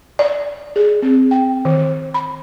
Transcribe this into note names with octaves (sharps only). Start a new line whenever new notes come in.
D5
G#4
C4
G5
D#3
B5